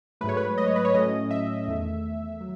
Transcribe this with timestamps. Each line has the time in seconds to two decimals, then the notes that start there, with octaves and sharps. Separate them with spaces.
0.21 G#2 F#3 A3 B4
0.29 C#5
0.37 B4
0.58 D#5
0.67 C#5
0.76 B4
0.85 C#5
0.94 A2 F#3 A3 C#4 D#5
1.31 E5
1.67 E2 D#3 A3
2.41 F#3